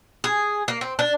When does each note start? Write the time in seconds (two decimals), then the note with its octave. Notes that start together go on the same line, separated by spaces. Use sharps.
0.24 G#4
0.68 A#3
0.81 C4
0.99 D4